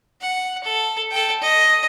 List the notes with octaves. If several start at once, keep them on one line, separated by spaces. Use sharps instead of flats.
F#5
A4
A4 G5
D#5